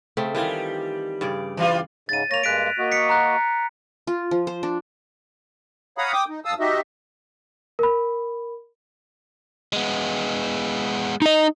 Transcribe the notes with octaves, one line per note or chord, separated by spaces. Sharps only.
C#3 A3 C4
D#3 E3 G3 F4
G2 C#3 D5
E3 G3 F4
G#2 C#3 A6 D#7
A#3 C#5 A#6 F7
G2 G#3 A#3 F#6 B6 D7
A#3 F#4 D#5
B6 C#7
A#5 F#6
F4
F3
C5
D4
C#5 F5 F#5 A#5 B5 D#6
G5 D6 D#6
D#4
F#2 F5 A5 D#6 E6
D#4 F#4 G4 D#5 E5
A#4 B5
G#3 B3
D#4 D#5